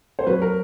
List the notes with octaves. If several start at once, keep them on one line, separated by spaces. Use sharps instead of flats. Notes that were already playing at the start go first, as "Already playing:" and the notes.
C5
F#3 B4
A#4